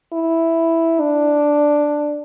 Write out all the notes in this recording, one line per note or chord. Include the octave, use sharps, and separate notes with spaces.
E4
D4